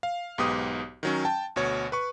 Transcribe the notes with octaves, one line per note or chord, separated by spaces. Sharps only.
F5
B1 G#2 B3 G4 D#6
D#3 F#3 C#4
G5 A5
D2 B2 C#5 C#7
B4 C#6